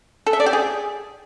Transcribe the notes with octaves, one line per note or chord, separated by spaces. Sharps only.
A4
E5
D5
G4
G#4